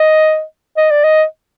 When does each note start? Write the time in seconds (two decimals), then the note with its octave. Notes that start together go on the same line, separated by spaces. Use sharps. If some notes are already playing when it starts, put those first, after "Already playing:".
Already playing: D#5
0.77 D#5
0.91 D5
1.04 D#5